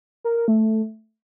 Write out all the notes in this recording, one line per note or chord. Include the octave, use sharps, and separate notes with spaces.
A#4
A#4
A3